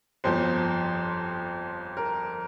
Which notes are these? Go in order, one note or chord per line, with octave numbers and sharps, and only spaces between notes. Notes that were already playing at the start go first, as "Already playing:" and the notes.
G1 F2 F3 C5
A#4